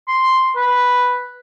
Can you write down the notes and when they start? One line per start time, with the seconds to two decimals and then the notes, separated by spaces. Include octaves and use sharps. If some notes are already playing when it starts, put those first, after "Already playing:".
0.08 C6
0.56 B4